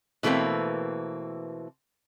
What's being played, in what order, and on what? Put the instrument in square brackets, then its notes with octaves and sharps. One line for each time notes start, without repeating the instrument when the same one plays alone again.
[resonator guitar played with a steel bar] B2 E3 A3 A#3 C4